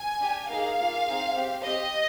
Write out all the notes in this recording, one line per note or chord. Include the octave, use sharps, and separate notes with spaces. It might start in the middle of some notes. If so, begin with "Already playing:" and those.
Already playing: G#5
D4 G4
A#3 D#4 G#4 F5
A#3 F4 G#4
C4 D#4 G#4
C4 G4
C4 G4 D#5